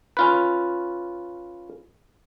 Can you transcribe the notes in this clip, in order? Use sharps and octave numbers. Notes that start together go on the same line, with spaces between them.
C#4 F4 B4